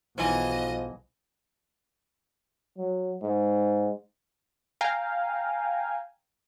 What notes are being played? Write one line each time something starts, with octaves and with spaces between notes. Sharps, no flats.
B1 G#2 E3 F3 D#5 G#5 D#7
F#3
G#2
F5 G5 G#5 A#5